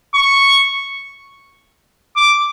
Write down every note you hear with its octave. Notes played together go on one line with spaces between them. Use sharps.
C#6
D6